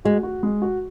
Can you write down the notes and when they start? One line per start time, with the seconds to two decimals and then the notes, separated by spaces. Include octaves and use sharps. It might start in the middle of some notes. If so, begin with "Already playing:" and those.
0.05 G#3 F#4
0.23 F#4
0.43 G#3
0.62 F#4